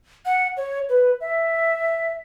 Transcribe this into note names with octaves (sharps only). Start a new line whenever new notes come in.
F#5
C#5
B4
E5